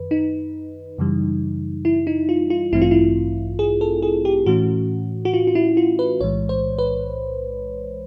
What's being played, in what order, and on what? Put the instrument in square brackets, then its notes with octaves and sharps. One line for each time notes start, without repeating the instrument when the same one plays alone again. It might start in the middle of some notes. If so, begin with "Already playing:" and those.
Already playing: [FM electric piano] F#2 D#3 B4
D#4
F#2 C#3 E3 G3
E4
D#4
F4
F4
A1 G2 E3 A3 C4 E4
F4
E4
G#4
A4
G#4
G4
A2 E3 A3 C#4 F#4
F#4
F4
F4
E4
F4
B4
B1 A2 E3 G#3 C#5
C5
B4